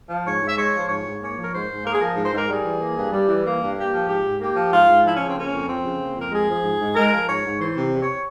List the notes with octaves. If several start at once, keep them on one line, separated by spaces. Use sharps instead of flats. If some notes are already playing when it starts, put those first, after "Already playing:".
F3
G#2 C#5
G#2
E5
G#3 C#5
F3
C5
G#2 C#5
G#2
A#3 C#5
F3
A#4
G#2 C5
G#2
A#3 A#4
G#4
F3 A#4
G#2
C5
G#2 A#4
G3 G#4
E3
A#3
G2
G3
E3
A#3
G2
A#3 G4
F3
G#2 G4
G#2
A#3 G4
F3
G#2 F4
G#2
F3 E4
C#3 C#4
C4
A#3 C#4
F2
F3 C4
C#3
A#3
F2
A#4
G#3 G#4
F3
G#2
G#2
G#3 A#4
F3
G#2 C#5
G#2
E3 C5
C3
E2
C#5